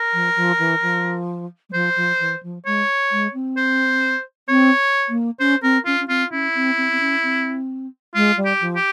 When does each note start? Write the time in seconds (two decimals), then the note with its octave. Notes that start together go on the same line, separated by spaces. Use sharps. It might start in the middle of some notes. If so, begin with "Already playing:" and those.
Already playing: A#4
0.14 F3
0.36 F3
0.59 E3
0.82 F3
1.69 G3
1.73 F3 C5
1.96 F3
2.20 E3
2.43 F3
2.66 G#3 C#5
3.12 G#3
3.34 C4
3.57 C5
4.49 C4 C#5
5.09 A#3
5.39 C#4 C5
5.63 C4 A#4
5.85 C#4 F4
6.00 C#4
6.08 C4 F4
6.31 C#4 E4
6.55 C4
6.77 C4
6.92 C4
7.00 C#4
7.23 C4
8.15 G#3 F4
8.37 G3
8.45 G4
8.61 F3
8.76 G4